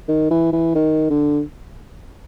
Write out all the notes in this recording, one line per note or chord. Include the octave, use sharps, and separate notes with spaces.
D#3
E3
E3
D#3
D3